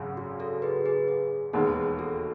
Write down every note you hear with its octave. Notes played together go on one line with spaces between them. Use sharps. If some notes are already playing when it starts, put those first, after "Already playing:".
Already playing: G#1 F#2 C#3 F#3
F#4
F#4 A4
G#4 B4
G#4 B4
G#4
E1 D#2 D#3 G#3 B3 G#4
F#4 A4